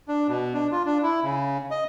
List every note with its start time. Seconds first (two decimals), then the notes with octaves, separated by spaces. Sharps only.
0.08 D4
0.28 B2
0.54 D4
0.72 F4
0.86 D4
1.03 E4
1.23 C#3
1.71 D#5